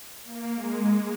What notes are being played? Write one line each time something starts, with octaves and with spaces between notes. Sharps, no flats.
A#3
G#3